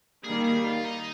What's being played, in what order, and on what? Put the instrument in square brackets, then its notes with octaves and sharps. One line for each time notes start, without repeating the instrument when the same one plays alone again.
[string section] D#3 G3 A#3 [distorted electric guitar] G#4
[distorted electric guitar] G#4
F4
D#4